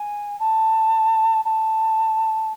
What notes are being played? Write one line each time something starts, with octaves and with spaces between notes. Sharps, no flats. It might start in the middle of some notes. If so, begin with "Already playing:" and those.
Already playing: G#5
A5
A5